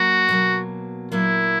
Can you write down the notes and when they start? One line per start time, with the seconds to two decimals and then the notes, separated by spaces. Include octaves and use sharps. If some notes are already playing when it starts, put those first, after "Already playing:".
Already playing: F#3 A#3 F#4
0.29 B2 F#3 A#3
1.12 A#2 F#3 A#3 E4